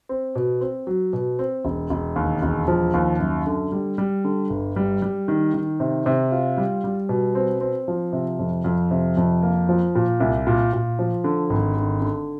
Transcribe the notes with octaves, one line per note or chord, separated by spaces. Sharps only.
C4
B2
C4
F#3
B2
C4
E1
E1
D#2
E1
F3
D#2
F#2
D3
G3
G3
D3
G1
G3
G3
D#3
D#3
C3
C3
F4
G3
G3
B2
C4
C4
F3
C3
F2
F2
C3
F2
A#3
F3
A#2
C2
A#2
A#2
F3
D3
G#1
D3
D3